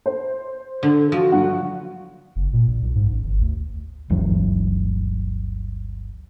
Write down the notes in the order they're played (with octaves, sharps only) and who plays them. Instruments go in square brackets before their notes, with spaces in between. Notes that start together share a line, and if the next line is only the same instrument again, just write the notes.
[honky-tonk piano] C5
[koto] D3 [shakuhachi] A4
[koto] F3 [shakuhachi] F#4
[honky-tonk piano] G2 F#3 F#5
[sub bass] F#1
A#2
A#1
B1
G#2
A1
G1
D2
[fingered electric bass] G1 D2 E3 F#3